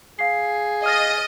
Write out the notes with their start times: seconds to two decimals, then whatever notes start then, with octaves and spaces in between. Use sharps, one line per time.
0.19 G#4 F5 C7
0.84 D#5 D#6 F6 A6